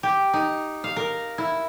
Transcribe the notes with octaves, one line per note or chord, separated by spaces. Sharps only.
G4
D#4
F5
A#4
E4